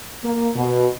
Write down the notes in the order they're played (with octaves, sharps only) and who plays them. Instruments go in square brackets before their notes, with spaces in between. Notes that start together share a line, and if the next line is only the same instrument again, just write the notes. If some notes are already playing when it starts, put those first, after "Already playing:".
[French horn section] A#3
B2